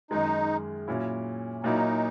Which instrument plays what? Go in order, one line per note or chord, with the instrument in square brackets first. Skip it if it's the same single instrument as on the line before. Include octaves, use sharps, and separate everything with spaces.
[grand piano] F#2 D#3 G#3 [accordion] D#4
[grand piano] A#2 F#3 C#4 E4
[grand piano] A#2 F#3 A#3 E4 [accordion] D#4